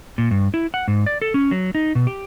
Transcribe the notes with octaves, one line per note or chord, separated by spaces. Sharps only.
A#2
G2
E4
F#5
G#2
D5
A4
C#4
F#3
D#4
B2
G4